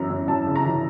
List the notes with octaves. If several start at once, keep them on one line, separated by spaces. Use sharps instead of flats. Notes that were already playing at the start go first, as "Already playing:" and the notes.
Already playing: F#2 E3 A#5
F#2
F#2 A5
C#3
A#5
E3